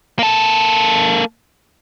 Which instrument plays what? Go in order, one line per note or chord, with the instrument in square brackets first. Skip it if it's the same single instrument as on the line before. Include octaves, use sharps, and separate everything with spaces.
[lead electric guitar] A#3 A4